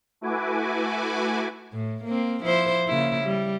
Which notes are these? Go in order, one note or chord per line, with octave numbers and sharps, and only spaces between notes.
A3 E4 F#4 B4 G#5 D6
A2
A#3 C4
F3 E4 C5
C#3 A#3 E4
G3